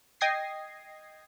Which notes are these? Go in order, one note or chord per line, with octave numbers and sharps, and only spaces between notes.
D#5 G5 D#6 G#6 A#6 C7